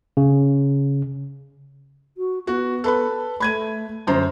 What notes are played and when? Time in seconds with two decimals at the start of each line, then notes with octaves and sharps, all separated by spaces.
0.17 C#3
2.17 F#4
2.47 B3 F#4
2.84 A4 B4 B5
3.40 A3 B5 G#6 D#7
4.07 F#2 D3 C5 A#5